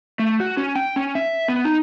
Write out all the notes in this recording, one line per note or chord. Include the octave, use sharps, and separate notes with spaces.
A3
F#4
C#4
G5
C#4
E5
B3
D#4